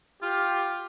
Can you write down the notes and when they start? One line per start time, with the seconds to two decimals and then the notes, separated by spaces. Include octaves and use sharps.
0.23 F4 G4